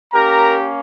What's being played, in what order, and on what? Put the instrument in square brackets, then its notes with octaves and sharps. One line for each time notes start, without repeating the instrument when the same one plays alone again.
[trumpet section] A#3 C#4 G4 A#4 A#5